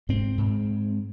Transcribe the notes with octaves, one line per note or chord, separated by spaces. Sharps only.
G#2 C4
G#2